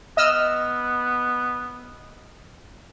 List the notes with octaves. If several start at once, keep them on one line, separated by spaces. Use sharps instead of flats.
B3 D#5 E6 F6